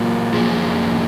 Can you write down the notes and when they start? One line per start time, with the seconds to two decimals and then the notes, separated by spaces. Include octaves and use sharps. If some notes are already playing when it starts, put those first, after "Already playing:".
Already playing: A#2 F#3 A#3
0.33 F#2 F3 A#3 G#4